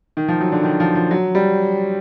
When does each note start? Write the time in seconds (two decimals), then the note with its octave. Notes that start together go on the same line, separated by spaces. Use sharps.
0.17 D#3
0.28 F3
0.40 F#3
0.52 D3
0.64 D#3
0.80 F3
0.95 F3
1.11 F#3
1.35 G3